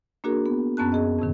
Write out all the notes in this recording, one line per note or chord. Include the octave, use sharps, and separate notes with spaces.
A#3 D4 F#4 G#4 A#4
B3
F#2 B3 C#4 A5 F#6
G#4 D#5
F2 A2 C3 D#3